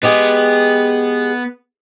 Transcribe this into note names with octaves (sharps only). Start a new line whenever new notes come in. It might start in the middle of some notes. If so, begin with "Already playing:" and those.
G#3 B3 G4 G#4